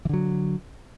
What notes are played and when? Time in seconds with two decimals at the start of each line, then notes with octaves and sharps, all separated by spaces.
0.05 E3
0.09 D3
0.13 F#3